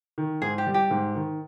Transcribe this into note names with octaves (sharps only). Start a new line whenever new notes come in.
D#3
G#2 G#4
G4
G3
G4
G#2
D#3